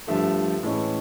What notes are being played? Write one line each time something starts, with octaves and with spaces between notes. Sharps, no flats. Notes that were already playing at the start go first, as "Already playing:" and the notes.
G2 D3 F3 A3 E5
A2 E3 G#3 C#4